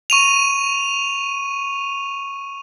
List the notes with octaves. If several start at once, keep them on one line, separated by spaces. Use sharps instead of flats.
C#6 D#7 F7